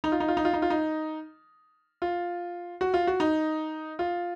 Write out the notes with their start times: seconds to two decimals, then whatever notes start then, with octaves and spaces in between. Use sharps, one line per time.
0.04 D#4
0.12 F4
0.20 D#4
0.28 F4
0.37 D#4
0.45 F4
0.53 D#4
0.62 F4
0.70 D#4
2.02 F4
2.81 F#4
2.94 F4
3.07 F#4
3.20 D#4
3.99 F4